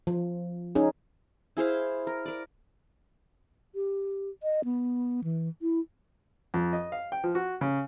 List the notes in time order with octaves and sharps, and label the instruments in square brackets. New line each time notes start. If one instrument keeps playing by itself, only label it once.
[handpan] F3
C#4 D#4 G#4
[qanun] E4 G#4 C5 F5
A#4
A#4 D5
[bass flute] G4
D#5
B3
E3
E4
[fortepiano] F2
D#5
F5
G5
F3
F#4
C#3